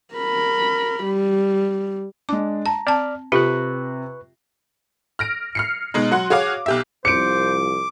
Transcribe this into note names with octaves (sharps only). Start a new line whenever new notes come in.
A#4 B5
G3
G#3 D4 D6
A5 A#5
C4 D5 A5 F6
C3 F4 G4 A4 B4 C#6 F#6
F6 A#6 D7
F6 C7 C#7
B2 G#3 D#4
F#3 F#4 F#5 C6
F#4 G#4 C#5 F5 D6
B1 G4 E5
C2 F3 C5 D6 C#7 D7